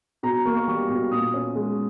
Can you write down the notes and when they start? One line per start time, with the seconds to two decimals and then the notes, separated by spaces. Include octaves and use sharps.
0.23 B2 A#5
0.45 A#3 C#6
0.56 C#6
0.68 G3 C#6
0.89 B2
1.12 A#2 D#6
1.34 C#4
1.55 G#3